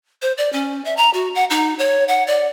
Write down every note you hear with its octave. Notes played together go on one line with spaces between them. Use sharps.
C5
D5
C#4
E5
A#5
F#4
F#5
D#4
C#5
F#5
D5